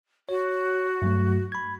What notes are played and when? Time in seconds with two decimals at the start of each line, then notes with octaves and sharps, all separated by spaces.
0.29 F#4 C#5
1.02 G2 F#3 A3
1.52 B5 G#6